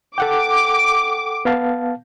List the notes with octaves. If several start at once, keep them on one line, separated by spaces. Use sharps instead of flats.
A4 F#5 G5 D6
B3 F5 A5